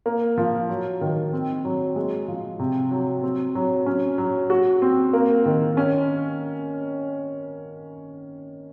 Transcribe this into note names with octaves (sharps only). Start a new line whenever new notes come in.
A#3
F3
F#3
D#3
C4
F#3
G#3
F3
C3
F#3
C4
F#3
C#4
F#3
F#4
C4
A#3
D#3
C#4